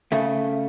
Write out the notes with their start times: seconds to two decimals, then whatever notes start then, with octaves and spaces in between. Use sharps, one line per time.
0.12 C#3 A3